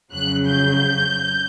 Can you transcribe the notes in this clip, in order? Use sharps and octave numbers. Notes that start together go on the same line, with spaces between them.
F2 C#3 F#3 F#6
G6